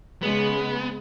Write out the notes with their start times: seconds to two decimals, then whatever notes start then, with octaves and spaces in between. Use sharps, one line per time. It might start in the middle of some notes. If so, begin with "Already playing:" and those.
0.23 C#3 G#3 B3